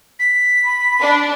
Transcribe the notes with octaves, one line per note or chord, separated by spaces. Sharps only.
B6
B5
D4